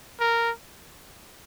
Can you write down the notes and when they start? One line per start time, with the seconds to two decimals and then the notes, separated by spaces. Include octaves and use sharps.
0.20 A#4